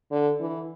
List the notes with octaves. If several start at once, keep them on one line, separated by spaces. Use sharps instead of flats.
D3
E3